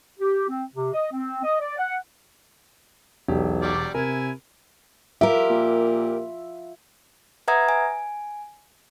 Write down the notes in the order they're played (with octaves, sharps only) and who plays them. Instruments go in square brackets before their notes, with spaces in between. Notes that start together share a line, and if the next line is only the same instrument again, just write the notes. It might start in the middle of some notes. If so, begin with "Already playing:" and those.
[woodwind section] G4
C4
C3
D#5
C4
D#5
D5
F#5
[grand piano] E1 G4 [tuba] B1
[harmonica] F#3 G3 D5
[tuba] C3 [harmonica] E4 G#5 [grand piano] A#4
[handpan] F4 E5 [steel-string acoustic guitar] G4 A#4
[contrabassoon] A#2
[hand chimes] B4 E5 F#5 A#5 D#6 G#6
G#5